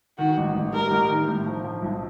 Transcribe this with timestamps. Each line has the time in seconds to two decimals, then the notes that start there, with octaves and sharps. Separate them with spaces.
0.18 D#3 F#4
0.37 A1
0.54 A1
0.73 G3 A#4
0.91 A1
1.09 D#3
1.28 A2
1.46 F3
1.64 F3
1.82 B1